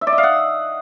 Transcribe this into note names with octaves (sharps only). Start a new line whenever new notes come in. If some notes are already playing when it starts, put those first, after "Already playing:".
E5
D5
D#5
F5
F#5